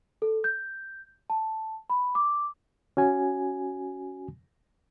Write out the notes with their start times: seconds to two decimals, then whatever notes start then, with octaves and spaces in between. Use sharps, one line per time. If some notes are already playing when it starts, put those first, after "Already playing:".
0.22 A4
0.44 G6
1.30 A5
1.90 B5
2.15 D6
2.97 C#4 F#4 G#5